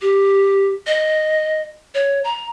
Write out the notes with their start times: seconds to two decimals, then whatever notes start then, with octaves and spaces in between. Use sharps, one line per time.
0.01 G4
0.87 D#5
1.95 C#5
2.24 A#5